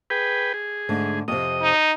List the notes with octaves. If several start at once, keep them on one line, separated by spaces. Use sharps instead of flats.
G#4 B4 G5
G#4
G#2 D3 A3
F2 C3 D#5
D#4